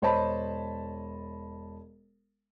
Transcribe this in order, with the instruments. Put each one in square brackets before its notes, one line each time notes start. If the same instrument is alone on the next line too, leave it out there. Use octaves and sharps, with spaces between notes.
[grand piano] E1 C5 C#5 D#5 A5 B5